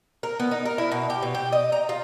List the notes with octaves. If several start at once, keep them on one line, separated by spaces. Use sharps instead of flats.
A#4
B3
D#4
A#4
E4
B2
G4
B2
G4
D#5
A#5
F4